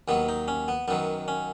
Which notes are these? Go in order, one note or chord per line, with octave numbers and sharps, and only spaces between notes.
D#2 D#3 F#3 B3
D#4
C#4
B3
F#2 D#3 F#3 B3
C#4